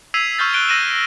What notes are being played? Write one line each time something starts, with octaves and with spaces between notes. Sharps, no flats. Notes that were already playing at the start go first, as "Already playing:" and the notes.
E6 G#6 B6 C7 D#7 F7
C#6 E6 F6 G6 A6
F#6 D7 G7
E6 A#6 D#7 E7